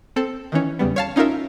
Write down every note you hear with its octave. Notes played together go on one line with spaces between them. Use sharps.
C4 A4
D#3 E3 C#4
E2 C#3 G3 B3
C#5 F5 A5
C#4 D#4 F4 A#4 E5